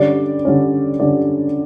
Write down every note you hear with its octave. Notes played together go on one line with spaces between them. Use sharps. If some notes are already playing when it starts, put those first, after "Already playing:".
Already playing: D3 G3 C#4 D5
D3 G3 C#4
D3 G3 C#4 D5